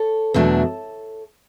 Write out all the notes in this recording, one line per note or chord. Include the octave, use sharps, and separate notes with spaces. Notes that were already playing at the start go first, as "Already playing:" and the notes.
Already playing: A4 C#5
E2 B2 F#3 A3 D4